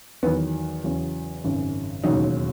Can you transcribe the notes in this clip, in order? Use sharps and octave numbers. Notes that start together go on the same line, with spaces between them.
E2 D#3 F#3 B3
E2 C#3 F#3
G#1 F#2 C#3
E1 D#2 C#3 F#3 D#4